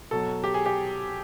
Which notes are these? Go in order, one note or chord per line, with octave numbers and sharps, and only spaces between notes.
B2 F#3 A4
G4
G#4
G4